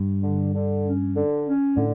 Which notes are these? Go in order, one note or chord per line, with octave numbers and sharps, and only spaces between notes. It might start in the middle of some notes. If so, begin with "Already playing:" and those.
Already playing: G2
D3
D3
C#4
D3
C#4
A2 D3